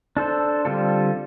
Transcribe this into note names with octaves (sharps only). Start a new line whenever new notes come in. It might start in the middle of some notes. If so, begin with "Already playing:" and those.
D4 A4 C5
D3 G3 C4 F4 A4